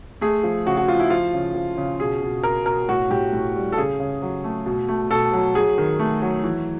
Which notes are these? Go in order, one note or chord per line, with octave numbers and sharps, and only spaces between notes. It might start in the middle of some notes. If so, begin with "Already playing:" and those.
A3 G#4
F3
C#3 F#4
F#4
F3 F4
E4
F3 F4
C#3
F3
C#3
B2 G#4
B2
B2 A#4
B2 A#4
A2 F#4
A2 G4
A2
G3
A4
C#3 G#4
C#3
F#3
A3
B2
A3
B2 A4
F#3
F#3 G#4
D#3
A3
F#3
E3